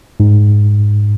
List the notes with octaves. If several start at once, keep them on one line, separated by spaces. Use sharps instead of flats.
G#2